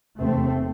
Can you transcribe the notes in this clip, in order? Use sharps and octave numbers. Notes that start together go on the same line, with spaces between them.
F1 E2 C3 A3 C4